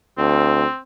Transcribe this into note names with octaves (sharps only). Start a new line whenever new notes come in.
D2 C4